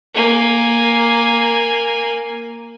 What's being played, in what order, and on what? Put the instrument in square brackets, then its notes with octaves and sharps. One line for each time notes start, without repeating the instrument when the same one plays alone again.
[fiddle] A#3 G#5